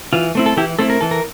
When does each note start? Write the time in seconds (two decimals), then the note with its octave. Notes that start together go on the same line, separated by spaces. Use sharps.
0.13 E3 F4
0.35 A3 C4 E4
0.46 A4
0.57 E3 E4 G4
0.79 A3 C4 E4 A4
0.90 A#4
1.01 E3 A4
1.11 A#4